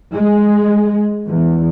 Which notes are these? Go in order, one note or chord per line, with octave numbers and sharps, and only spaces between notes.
G#3
E2